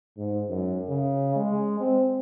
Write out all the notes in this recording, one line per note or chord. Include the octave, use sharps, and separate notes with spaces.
G#2
F#2
C#3
G#3
C4